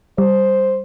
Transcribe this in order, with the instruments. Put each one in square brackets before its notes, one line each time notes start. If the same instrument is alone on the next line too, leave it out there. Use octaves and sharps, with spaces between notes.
[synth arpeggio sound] G3 [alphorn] C5